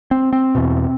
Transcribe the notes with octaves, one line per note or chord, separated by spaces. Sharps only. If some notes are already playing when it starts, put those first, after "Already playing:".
C4
C4
E2 B2